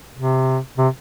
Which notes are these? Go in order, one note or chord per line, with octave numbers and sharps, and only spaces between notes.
C3
C3